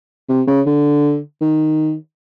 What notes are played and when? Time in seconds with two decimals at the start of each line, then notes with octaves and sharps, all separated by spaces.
0.29 C3
0.47 C#3
0.66 D3
1.41 D#3